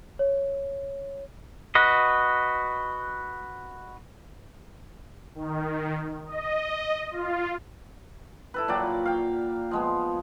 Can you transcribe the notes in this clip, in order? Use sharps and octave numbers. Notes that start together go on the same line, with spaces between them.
C#5
F#4 B4 D#5
D#3
D#5
F4
E4 A4 B4
A#2 F#3 D5 G5
F5 G5
F3 G#3 B3